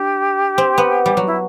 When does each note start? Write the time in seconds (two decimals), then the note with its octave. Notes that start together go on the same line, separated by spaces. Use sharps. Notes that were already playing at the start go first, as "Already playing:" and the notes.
Already playing: D4 G4
0.58 C4
0.78 B3
1.06 G3
1.17 F#3
1.26 E4